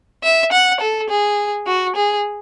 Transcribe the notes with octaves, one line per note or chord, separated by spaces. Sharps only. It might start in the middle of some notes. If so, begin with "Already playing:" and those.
E5
F#5
A4
G#4
F#4
G#4